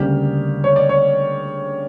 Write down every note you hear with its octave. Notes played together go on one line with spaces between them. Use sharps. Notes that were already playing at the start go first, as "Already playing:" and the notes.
Already playing: D2 C#3 G3 A#3 G4
C#5
D5
C#5